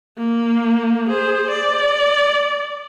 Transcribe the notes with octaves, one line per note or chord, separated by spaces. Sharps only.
A#3
G#4 C5
D5